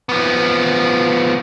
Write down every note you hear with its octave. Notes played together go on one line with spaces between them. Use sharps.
F3 B3